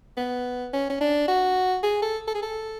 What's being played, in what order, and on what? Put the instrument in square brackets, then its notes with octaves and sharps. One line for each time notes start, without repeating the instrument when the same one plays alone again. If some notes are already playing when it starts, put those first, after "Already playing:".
[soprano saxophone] B3
C#4
C#4
D4
F#4
G#4
A4
A4
G#4
A4